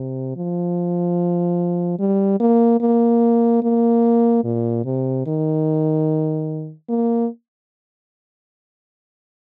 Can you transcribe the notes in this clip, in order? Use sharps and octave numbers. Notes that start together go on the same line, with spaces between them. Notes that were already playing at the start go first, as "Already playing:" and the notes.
Already playing: C3
F3
G3
A#3
A#3
A#3
A#2
C3
D#3
A#3